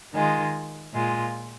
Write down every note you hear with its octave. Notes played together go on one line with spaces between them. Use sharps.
D#3 G#3 F4
A#2 G#3 F4